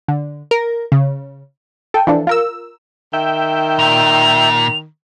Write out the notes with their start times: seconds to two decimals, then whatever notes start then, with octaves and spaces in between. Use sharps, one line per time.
0.08 D3
0.51 A#4
0.92 C#3
1.94 A4 G5
2.07 E3 F3 D4 A4
2.27 F4 A#4 E6
3.13 D#3 E5 G5
3.79 A#2 F7